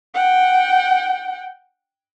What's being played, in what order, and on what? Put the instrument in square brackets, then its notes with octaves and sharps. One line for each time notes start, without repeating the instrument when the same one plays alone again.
[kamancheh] F#5 G5